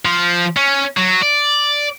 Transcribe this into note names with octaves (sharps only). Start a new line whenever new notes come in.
F3
C#4
F#3
D5